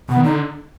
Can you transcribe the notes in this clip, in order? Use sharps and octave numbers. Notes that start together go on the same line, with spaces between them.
B2 B3
D#3
D3 D#4